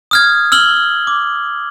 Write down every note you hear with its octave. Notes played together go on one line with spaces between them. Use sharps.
D#6 F6 G#6
E6 F6 F#7 G7
D6